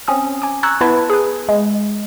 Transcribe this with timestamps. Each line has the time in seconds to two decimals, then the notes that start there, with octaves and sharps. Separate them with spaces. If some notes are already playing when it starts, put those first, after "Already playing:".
0.08 C4 C#4 D#6
0.42 G#5 D6
0.63 A#5 C#6 E6 F#6 G#6
0.81 B3 E4 B4 A5 B5 G#6
1.10 G#4 B4
1.49 G#3